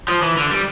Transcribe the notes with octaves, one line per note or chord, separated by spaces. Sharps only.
F3
E3
D3
G3